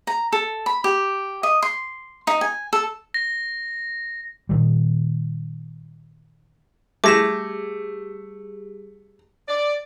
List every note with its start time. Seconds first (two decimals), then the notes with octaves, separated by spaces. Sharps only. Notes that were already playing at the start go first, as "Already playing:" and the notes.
0.07 A#5
0.33 A4
0.66 B5
0.84 G4
1.43 D#5
1.63 C6
2.27 D#4
2.41 G#5
2.73 A4
3.14 A#6
4.49 A#2 D#3 G3
7.04 G3 A3 G4 G#4 D6 A#6 E7
9.48 D5